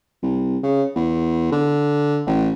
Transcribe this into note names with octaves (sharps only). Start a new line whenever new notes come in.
C2
C#3
E2
D3
A1